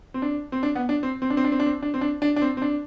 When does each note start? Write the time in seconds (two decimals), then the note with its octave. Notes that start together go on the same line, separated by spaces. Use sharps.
0.14 C4
0.22 D4
0.52 C4
0.63 D4
0.75 B3
0.89 D4
1.03 C4
1.22 C4
1.30 D4
1.37 C4
1.44 D4
1.52 C4
1.60 D4
1.66 C4
1.82 D4
1.94 C4
2.01 D4
2.22 D4
2.36 D4
2.42 C4
2.57 C4
2.62 D4